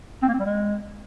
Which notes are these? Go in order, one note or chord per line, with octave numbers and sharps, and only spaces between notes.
C4
A#3
C4
G3
G#3